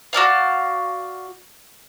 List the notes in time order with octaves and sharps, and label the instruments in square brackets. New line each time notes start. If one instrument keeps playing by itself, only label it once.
[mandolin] F#4 A#4 D5 F5